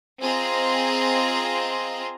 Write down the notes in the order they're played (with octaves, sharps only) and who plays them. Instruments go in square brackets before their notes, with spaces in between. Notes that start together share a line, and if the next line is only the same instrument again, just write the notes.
[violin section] C4 F4 G#4 D#5 A#5